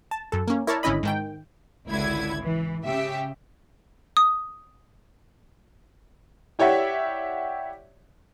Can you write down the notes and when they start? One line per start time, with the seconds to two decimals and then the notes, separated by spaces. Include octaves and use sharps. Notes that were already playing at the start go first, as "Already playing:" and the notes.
0.11 A5
0.32 F#2 A4
0.48 A#3 C#4
0.67 E4 A#4 C#5 D5 A5
0.83 G#1 D3 C#4 E4 D#5 B5
1.03 G#2 D#3 G5
1.88 G#1 C#2 D3 E4 G#6
2.41 E3
2.85 C#3 G4 E5
4.17 D#6
6.59 E4 G4 C#5 D5 E5 F#5